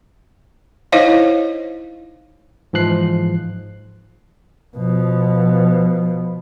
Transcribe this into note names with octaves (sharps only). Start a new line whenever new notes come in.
D#4 E4 C5 C#5 D#5 F5
G#2 E3 F3 F#6 C7
B2 F3